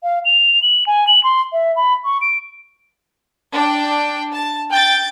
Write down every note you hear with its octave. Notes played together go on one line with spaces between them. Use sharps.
F5
F7
F#7
G#5
F#7
C6
E5
B5
C#6
D7
D4 G5
A5
G5 G6 A6